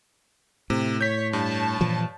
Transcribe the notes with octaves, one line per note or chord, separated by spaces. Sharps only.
A2 C3
C#5 G6 B6
G2 C#5 A5
A#2 E3 F3